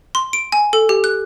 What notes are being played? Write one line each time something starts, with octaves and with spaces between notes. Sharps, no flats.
C6
D7
G#5
A4
G4
F#6